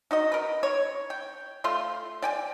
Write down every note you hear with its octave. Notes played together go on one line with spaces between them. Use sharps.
D#4 F#4 D#5
A#4 B4
C#5
G5
A3 F4 C6
D5 G5 G#5